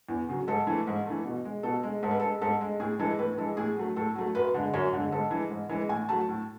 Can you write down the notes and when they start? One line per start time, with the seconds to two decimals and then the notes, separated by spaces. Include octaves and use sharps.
0.09 E2
0.28 C#3 F#3
0.47 G#2 A4
0.67 E3 A3
0.87 G#2
1.06 E3 A3
1.25 B2
1.45 G#3
1.63 B2 A4
1.83 G#3
2.03 G#2 A4
2.11 B4
2.20 G#3 A4
2.41 G#2 A4
2.61 G#3
2.80 A2 G#4
2.99 E3 G#3 A4
3.18 A2 B4
3.37 E3 G#3 A4
3.57 A2 G#4
3.77 F#3 A3
3.96 A2 A4
4.16 F#3 A3
4.35 F#2 B4
4.54 D3 G#3
4.73 F#2 C#5
4.93 D3 G#3
5.12 G#2 A4
5.31 E3 G#3
5.50 G#2
5.70 E3 G#3
5.89 A2 G#5
6.09 F#3 A3 A5
6.28 A2